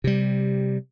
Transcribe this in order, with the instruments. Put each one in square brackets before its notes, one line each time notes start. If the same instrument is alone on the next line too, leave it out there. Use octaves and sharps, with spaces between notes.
[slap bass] C3 G3